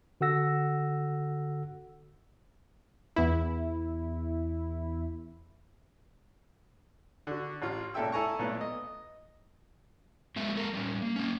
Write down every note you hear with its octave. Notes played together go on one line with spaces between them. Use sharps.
D3 F#4 A4 F#5 E6 A#6
E2 E4
D3 F#4
A1 F4
C#2 A#2 A4 E5 G5 E6
E4 A4 G#5 A#5 C#6
B1 A#2 A3 B3
D#5
F#3 G#3 A#3 E5
G#3 A4 A#4
G3 C#4
A#3
A#3 C#4